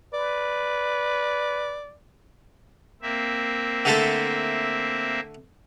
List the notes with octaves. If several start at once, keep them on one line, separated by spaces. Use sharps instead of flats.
B4 D5
A#3 C4 E5
D3 A3 A4